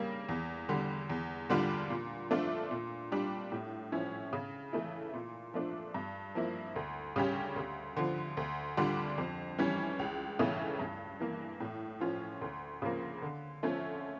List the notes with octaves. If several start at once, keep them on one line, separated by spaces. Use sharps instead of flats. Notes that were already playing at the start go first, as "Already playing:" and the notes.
Already playing: C#3 G3 A#3
E2
D3 G3
E2
D3 G3 D4 F4
A#2
F3 A3 D4 F4
A#2
G3 D4 G4
A2
F3 C#4 E4
C#3
E3 A3 E4
A#2
F3 A3 D4
G2
F3 A#3 E4
D2
C#3 G3 C#4 G4
D2
D3 F3
D2
D3 G3 D4 F4
F2
E3 G3 C#4
C#2
C#3 E3 A3 C#4
G2
E3 A#3
A2
F3 C#4 F4
D2
C#3 F3 A#3
D3
F3 A3 C#4